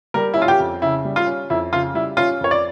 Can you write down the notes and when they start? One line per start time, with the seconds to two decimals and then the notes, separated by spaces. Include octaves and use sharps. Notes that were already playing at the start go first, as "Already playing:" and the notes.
0.14 G3 A#4
0.34 E4
0.37 C#4 F4
0.48 G4
0.60 F2
0.82 C#3 E4
1.05 G3
1.16 F4
1.27 C#4
1.50 F2 E4
1.72 C#3 F4
1.94 G3 E4
2.17 C#4 F4
2.41 F2 C#5
2.51 D5